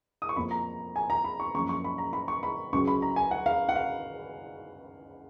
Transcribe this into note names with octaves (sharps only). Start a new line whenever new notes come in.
D#6
C#6
F2 F3 A#3 B5
A#5
G#5
A#5
B5
C#6
F#2 F3 A#3 C#6
C#6
B5
A#5
B5
C#6
B5
C#2 C#3 F#3 C#6
B5
A#5
G#5
F#5
F5
F#5
F5